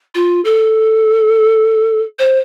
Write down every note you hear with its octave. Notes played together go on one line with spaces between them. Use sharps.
F4
A4
C5